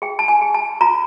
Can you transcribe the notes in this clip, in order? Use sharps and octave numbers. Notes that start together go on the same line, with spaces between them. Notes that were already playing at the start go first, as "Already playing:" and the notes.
G#4 G5
A5
G#5
G#4
A5
F4 A#5